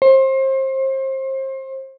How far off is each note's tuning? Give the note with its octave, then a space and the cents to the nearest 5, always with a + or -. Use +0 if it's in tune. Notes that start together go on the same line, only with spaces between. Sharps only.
C5 +30